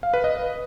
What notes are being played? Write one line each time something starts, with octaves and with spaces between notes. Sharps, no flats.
F5
B4
D#5